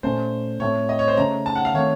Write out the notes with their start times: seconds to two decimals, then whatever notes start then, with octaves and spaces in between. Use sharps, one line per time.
0.03 A#2 A3 C#4 C5
0.60 A2 A3 C4 C#5
0.89 D#5
0.99 C#5
1.08 C5
1.17 C#3 A3 C#4 A#5
1.46 A5
1.55 F#5
1.65 F5
1.74 D#3 A3 C4 C#5